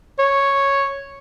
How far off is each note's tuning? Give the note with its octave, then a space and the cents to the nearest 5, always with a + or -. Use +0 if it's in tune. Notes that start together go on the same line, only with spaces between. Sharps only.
C#5 -5